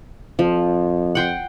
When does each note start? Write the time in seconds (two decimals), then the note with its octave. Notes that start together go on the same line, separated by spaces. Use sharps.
0.39 F2 F3
1.15 F#5 G5 C6